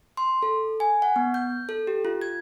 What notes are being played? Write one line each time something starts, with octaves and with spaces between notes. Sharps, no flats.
C6
A4
G#5
F#5
B3
G6
A4
G4
F4
G#6